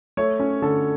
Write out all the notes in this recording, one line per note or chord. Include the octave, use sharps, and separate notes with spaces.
A3 C#5
C#4
D3 A4